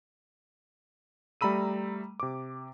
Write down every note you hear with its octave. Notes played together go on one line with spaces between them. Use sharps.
G3 A3 A#5 B5 E6 D#7
C3 D6